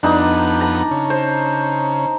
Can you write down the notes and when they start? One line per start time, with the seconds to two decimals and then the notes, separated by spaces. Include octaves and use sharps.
0.03 F2 B3 D4 D#4 F#5 A#5
0.61 A#5
0.91 C#3
1.10 C5